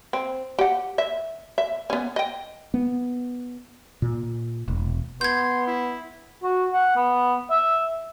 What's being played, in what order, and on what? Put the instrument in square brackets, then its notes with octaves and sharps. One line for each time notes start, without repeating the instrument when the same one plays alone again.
[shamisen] C4
G4 F#5
E5
E5
B3 C#4
D#5 G5
[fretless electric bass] B3
A#2
E1
[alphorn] B3 [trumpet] C6 [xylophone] G6 G#6
[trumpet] E4
[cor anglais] F#4
F#5
B3
E5